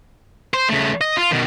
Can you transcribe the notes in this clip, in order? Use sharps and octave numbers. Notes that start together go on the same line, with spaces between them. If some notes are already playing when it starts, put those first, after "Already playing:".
C5
C#3 A3
D#5
F4
B2 D#3